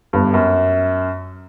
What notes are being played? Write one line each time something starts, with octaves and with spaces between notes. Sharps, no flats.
G1 G2
F#2